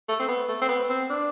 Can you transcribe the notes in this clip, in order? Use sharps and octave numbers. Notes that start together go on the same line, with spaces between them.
A3
C4
B3
A3
C4
B3
C4
D4